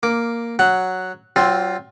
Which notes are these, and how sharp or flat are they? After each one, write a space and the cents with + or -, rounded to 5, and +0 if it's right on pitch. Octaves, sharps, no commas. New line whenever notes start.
A#3 +0 D6 +0
F#3 +0 F#5 +0
F#3 +35 C4 +5 F4 +10